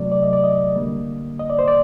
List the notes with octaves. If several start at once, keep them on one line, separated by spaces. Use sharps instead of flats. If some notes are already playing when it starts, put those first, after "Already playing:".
Already playing: C3 F#3 A3 D5
D5
D#5
D5
D#5
D3 G3 A#3
D#5
D5
C5
D5